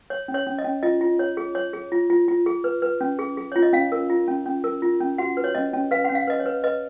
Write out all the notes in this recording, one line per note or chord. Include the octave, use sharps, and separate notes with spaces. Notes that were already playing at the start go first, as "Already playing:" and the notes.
C#5
C#4
C#5
C#4
D#5
C#4
F4 D#5
F4
C#5
G#4
C#5
G#4
F4
F4
F4
G#4
B4
B4
C#4
G#4
G#4
F4 C#5
D#5
C#4 F5
A#4
F4
C#4
C#4
A#4
F4
C#4
F#4 F#5
B4
C#5
C#4 D#5
C#4
B4 F5
C#4 F#5
F5
B4 D#5
C#5
B4
B4 D#5